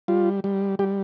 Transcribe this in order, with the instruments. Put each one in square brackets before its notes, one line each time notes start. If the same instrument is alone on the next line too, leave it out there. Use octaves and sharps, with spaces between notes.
[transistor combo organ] G3 F4
G3
G3 G4